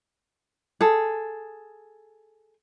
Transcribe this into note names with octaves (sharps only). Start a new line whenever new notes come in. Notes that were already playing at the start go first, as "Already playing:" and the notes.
G#4 A4